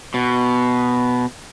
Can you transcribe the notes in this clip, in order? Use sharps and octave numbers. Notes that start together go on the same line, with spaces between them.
B2